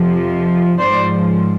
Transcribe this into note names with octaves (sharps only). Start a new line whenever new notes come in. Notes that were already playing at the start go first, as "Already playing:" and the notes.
Already playing: F2 C3 F3
G#2 F3 C5 D5